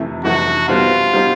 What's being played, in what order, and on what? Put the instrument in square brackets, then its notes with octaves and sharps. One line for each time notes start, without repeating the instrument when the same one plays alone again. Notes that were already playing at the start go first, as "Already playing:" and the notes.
Already playing: [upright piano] F2 C3 E3 A3
[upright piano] F2 C3 E3 A3 [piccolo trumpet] F#4
[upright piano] B2 G3 C4 D#4 [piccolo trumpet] F4
[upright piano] B2 G3 C4 D#4